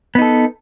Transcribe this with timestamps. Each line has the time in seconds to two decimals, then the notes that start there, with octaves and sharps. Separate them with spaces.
0.15 B3
0.18 D#4
0.22 A4